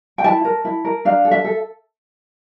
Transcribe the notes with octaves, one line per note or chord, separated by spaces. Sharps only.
G5
E4 A5
A#4
E4
A#4
D4 F5
A4
E5
A4